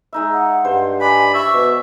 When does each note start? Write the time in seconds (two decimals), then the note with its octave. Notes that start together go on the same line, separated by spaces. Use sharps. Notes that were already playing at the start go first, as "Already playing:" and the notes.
0.13 G#3 D#4 E5
0.33 F#5
0.65 G2 C5
1.01 D5 G#5 B5
1.34 E5 C#6
1.53 B2